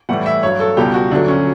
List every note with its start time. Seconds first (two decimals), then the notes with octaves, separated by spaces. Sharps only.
0.09 A2 E3 G3 F#5
0.26 E5
0.43 G2 F#3 C#5
0.60 A4
0.77 C#2 B2 G3 G4
0.94 F#4
1.11 D2 D3 F#3 D4
1.28 C#4